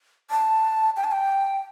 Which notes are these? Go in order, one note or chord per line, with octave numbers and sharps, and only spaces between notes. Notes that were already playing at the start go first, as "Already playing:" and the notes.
A5
G5
A5
G5